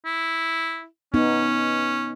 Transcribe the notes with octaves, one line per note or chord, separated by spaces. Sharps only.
E4
B3 C#4 D#4